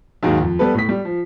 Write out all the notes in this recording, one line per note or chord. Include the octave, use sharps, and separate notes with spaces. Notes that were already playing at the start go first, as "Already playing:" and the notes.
D#2 G#2 D#3 F#3 G#3
F2
G3 B3 A4 B4
A2 B6
G3
F3